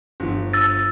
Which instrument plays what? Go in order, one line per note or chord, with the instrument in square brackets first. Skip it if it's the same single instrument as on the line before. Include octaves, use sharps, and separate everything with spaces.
[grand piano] G1 F3
[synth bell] E6 A6